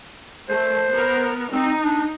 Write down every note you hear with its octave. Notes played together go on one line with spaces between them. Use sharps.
A3 C5
B3 A#4
C4 D#4
D4